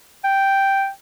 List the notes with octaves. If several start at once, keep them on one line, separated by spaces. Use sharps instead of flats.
G5